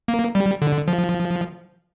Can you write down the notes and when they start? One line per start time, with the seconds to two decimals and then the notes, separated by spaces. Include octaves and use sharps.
0.08 A#3
0.35 G3
0.62 D3
0.88 F3